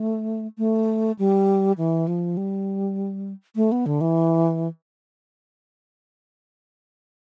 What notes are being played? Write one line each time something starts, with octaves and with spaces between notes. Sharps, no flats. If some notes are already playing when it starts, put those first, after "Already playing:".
Already playing: A3
A3
G3
E3
F3
G3
A3
B3
D3
E3